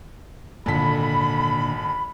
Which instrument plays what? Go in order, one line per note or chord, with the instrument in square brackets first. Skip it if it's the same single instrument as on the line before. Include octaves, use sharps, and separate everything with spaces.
[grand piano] G#1 A4 B6 [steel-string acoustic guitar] A#2 D3 D4 [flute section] B5